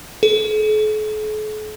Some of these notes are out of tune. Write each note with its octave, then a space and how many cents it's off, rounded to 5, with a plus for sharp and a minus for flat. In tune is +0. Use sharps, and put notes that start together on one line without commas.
A4 -45